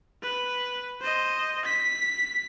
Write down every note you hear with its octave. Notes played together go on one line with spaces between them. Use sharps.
B4
C5 D#5
B6